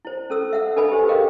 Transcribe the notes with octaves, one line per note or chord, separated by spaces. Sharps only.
E4 C5
C#4 A4 E6
E5 F#5 E6
D4 A4 B4 D#5 G#5 B5
G4 C5
G4 G#4 A#4 D#5 F5 G5